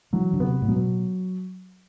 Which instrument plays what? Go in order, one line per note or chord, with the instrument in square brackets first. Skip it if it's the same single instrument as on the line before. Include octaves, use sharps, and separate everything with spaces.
[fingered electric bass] E3 [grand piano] F#3
[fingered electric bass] D3
[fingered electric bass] C3 [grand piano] B3
[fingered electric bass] A2
[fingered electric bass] B2 [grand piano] F#3